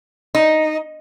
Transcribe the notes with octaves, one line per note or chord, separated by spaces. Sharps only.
D#4